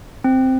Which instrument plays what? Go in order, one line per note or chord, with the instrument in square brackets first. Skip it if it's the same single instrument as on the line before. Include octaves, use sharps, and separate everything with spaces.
[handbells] C4